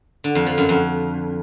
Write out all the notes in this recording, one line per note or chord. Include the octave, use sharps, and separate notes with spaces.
D3
F2
F3
F#2
F2